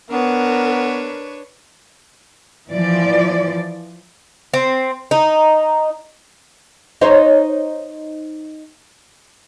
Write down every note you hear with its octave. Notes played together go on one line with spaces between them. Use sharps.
B3 D4 A#4 B4 C#5
E3 F3 D5
C4
D#4
D#4 C5 C#5